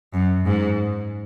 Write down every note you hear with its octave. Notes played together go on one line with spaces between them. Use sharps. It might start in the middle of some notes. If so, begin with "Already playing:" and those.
F#2
G#2